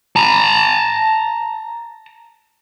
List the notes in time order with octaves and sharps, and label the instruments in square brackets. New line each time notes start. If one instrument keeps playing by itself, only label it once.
[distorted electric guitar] A5 A#5